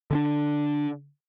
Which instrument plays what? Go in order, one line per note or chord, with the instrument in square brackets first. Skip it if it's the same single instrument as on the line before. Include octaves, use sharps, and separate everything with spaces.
[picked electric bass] D3 C#4 D4